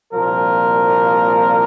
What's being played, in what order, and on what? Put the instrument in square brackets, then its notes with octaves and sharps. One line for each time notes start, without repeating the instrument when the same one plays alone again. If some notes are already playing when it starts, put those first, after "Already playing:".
[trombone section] C2 A#2 F3 A#3 A#4